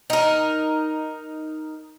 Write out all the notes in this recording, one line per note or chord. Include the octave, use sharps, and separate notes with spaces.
D#4 A#4